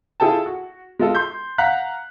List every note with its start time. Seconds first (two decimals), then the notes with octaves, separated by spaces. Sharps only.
0.20 E4 F4 G#4 A4 G5 A5
0.46 F#4
0.99 G#3 F4 A4
1.15 C6 G6
1.58 F5 F#5 A#5 F#6 B6